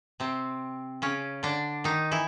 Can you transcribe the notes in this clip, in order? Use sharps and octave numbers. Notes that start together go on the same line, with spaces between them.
C3 C4
C#3 C#4
D3 D4
D#3 D#4
E3 E4